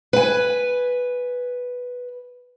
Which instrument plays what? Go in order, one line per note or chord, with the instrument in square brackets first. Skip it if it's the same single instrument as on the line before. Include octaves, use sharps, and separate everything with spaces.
[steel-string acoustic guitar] B4 G#5